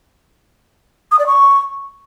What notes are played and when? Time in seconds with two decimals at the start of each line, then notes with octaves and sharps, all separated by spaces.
1.11 D#6
1.19 D5
1.27 C#6